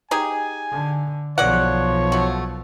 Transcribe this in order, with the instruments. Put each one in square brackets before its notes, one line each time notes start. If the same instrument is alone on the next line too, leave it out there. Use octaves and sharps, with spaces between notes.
[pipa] D#4 G4 G#4 [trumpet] G#5
[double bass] D3
[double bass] B1 F3 [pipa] G#3 D5 F#5 [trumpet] C#5
[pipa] A3 F#4